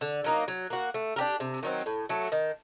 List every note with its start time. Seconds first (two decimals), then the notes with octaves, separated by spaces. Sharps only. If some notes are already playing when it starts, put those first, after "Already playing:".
0.01 D3
0.24 F#3 A#3 D#4
0.48 F#3
0.70 A#3 F#4
0.94 A3
1.16 D4 G4 A#4
1.40 C3
1.63 D#3 F#3 C4
1.86 A2
2.09 F#3 A3
2.32 D#3